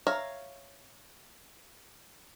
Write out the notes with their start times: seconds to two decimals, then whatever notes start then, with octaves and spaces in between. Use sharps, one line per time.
0.07 C#5 E5 F5 A#5